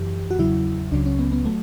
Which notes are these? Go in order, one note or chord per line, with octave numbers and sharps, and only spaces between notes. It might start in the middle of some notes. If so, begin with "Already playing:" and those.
Already playing: F#2 E3 G4
F#4
E2 C#3 F#3 E4
C#2 C#3 F#3 D4
C#4
B3
B3
F#3 A3